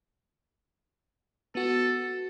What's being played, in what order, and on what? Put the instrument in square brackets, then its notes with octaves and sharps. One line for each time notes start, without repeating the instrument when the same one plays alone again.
[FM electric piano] B3 F#4 [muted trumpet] A4